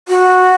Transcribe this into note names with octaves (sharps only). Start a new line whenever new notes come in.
F#4